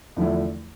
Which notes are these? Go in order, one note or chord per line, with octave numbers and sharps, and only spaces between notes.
E2 D3 F3 A3 E4